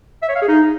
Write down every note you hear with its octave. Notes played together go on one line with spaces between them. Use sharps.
E5
C#5
F5
G#4
D#4